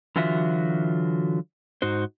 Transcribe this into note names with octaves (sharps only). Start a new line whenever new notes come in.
D3 E3 F#3 F4 F#4 E5
G#2 D#4 F#4 C5